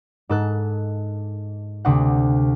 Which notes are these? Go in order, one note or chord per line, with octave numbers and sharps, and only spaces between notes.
G#2 A4 F#6
D2 C3 C5 F#5